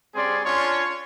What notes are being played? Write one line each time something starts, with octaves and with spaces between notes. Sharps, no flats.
G3 C4 C#4 G#4 D5 C6
C#4 D4 F4 C#5 C6